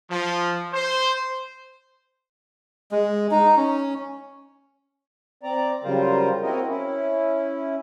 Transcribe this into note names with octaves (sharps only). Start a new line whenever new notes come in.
F3
C5
G#3
D#4
C#4
C4 D5 A#5
C#3 F#3 G3 F4 A#4 C5
A#3 C4 E4 F#4 A#4 D#5
C#4 E4